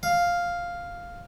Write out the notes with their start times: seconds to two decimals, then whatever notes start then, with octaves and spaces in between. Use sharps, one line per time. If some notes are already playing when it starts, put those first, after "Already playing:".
0.03 F5